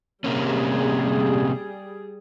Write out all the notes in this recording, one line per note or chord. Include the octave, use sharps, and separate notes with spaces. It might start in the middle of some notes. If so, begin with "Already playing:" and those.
C3 G3 A#3 C#4 G#4